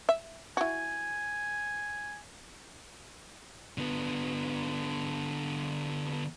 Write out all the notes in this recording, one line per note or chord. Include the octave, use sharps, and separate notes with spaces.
E5
E4 F#4 G#5
D3 B3